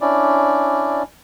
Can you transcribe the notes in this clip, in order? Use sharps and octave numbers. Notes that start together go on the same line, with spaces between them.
C#4 D4 E4 D5